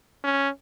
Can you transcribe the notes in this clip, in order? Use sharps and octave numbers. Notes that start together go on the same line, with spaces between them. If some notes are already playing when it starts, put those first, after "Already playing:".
C#4